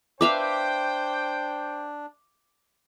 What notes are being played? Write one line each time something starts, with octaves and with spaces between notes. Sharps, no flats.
D4 B4 C5 E5 F5 G5 D6